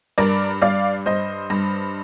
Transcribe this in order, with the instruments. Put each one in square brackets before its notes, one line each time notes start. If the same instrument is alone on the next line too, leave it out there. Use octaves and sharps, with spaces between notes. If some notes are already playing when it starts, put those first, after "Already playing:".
[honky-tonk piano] G2 A#4 D5
G2 D5 F5
G2 C5 D#5
G2